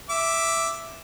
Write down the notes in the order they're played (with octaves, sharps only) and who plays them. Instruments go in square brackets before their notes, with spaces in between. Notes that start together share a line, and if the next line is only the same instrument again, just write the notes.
[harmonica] E5 D6